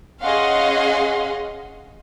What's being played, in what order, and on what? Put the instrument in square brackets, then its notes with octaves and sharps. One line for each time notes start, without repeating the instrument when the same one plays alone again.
[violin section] C#4 G#4 D#5 F5 F#5 C6